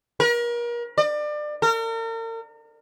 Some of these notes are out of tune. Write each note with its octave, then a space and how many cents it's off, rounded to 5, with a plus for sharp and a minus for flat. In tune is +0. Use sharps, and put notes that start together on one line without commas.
A#4 +35
D5 +30
A#4 -40